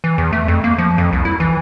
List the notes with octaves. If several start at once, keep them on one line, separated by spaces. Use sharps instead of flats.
E3
E2
A3
F2
A#3
F3
F2
C2
E4
E3